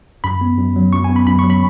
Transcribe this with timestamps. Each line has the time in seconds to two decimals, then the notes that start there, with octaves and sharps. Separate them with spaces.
0.24 F#2 B5
0.41 B3
0.58 F#2
0.76 F#3
0.93 F#2 C#6
1.04 G#5
1.10 B3
1.16 B5
1.27 F#2 B5
1.39 F#3 C#6
1.50 B5